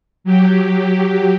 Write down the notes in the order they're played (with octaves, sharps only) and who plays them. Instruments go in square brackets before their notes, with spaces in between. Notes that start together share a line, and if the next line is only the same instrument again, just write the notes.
[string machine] F#3 G4